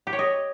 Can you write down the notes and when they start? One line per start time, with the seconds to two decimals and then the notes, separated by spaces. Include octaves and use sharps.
0.07 G4
0.13 C#5
0.19 D#5